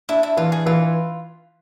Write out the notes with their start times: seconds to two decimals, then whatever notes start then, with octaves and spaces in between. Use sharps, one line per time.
0.09 D4 E4
0.23 E4
0.37 E3 F4
0.52 G#4
0.66 E3 F4